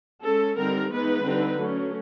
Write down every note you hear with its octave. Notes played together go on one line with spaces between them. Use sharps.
G#3 C#4 A4
D3 G3 C4 D#4 A#4
E3 G#3 B3 D#4 B4
D3 G3 C4 D#4
F#3 A3 C#4